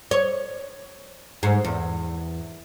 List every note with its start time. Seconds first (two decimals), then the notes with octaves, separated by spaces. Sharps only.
0.11 C#5
1.43 G#2
1.65 E2